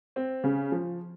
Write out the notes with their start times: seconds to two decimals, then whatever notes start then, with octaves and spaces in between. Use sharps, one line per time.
0.16 C4
0.44 C#3
0.72 F3